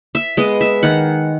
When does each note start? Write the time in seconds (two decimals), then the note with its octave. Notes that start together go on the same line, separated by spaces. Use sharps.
0.15 E5
0.37 G#3 B3 D#5
0.61 E5
0.83 D#3 F#5